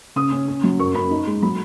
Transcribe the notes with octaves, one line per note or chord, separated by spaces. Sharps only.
C#3 D#6
C#4
C#4
F#3
F#2 C#6
F#2 B5
D#4
G#3
F#3 B5